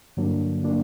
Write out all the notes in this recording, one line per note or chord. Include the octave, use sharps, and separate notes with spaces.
G2 D3 F#3 A#3 D4
D3 F#3 A#3 D4